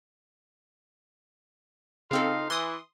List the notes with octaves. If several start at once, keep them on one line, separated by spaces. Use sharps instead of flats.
C#3 C4 D#4 F4 A4 F5
E3 C6 D#6